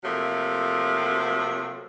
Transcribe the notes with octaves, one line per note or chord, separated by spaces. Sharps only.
C3 F3 F#3 A3 A#3